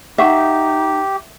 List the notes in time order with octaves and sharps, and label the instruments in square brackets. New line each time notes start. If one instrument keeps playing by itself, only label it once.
[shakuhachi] D#4 [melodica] G4 [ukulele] E5 [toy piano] F#5 C#6